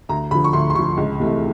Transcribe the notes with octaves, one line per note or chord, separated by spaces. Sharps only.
D2 A#5
D3 F3 B5
C#6
D2 C6
C6
D3 F3 C#6
C#2
C3 E3 A3